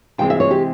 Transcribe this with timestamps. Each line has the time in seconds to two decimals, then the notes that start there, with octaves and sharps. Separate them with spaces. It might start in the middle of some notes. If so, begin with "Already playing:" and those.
0.18 C3 E3 G#3 C4 G5
0.30 E5
0.40 C#5
0.51 G4